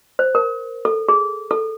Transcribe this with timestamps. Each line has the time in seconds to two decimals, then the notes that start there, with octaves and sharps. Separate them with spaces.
0.19 C5
0.35 A#4
0.85 A4
1.08 G#4
1.51 A4